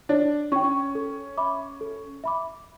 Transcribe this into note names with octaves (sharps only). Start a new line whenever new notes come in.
D4 C#5
C#4 G5 C#6
A4
E5 B5 D6
A4
E5 B5 D6